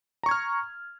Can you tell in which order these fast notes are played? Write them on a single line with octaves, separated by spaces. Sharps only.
A#5 C#6 G#6 F6